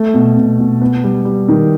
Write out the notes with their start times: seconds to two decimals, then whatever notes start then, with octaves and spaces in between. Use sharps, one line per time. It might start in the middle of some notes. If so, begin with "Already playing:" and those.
Already playing: A3
0.14 B2
0.37 B2
0.59 B2
0.81 B3
1.04 G3
1.25 G3
1.48 D#3